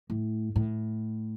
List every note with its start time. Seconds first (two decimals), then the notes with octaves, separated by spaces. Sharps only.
0.10 A2
0.56 A2